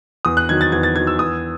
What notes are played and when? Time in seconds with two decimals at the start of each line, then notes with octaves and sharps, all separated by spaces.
0.25 E2 D#6
0.37 F#6
0.49 D#3 F#3 G#6
0.61 A6
0.72 E2 G#6
0.83 A6
0.96 D#3 F#3 G#6
1.07 E6
1.19 E2 D#6